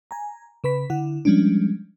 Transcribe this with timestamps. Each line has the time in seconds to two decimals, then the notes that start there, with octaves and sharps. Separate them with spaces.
0.11 G#5 A#5
0.64 C#3 B4 B5 B6
0.90 D3 E4 F#5
1.25 F3 G3 G#3 C#4 D4